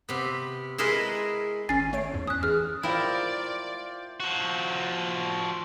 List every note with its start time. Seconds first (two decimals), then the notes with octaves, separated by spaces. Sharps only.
0.09 C3 B3
0.78 G#3 E4 G#4 A#4 B4 D#5
1.69 G#1 C#4 G#5 A6 C7
1.93 A3 C#5 D7
2.13 E2 G#2
2.27 C#4 D#6 F#6
2.43 E3 G#4 F6
2.83 E4 F4 A#4 C5 D5 G5
4.20 F3 F#4